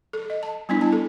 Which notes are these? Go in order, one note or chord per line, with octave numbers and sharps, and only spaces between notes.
A4
D#5
A5
G3 B3 D4 E4
A5
A4